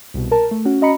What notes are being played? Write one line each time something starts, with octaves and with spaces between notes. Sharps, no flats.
C2 B2
A#4 A5
A3
C#4 F#4
C#4 F#4 D#5 A#5 B5 C#7